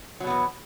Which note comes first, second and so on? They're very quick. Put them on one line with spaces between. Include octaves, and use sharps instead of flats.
F#3 B2 B3 E3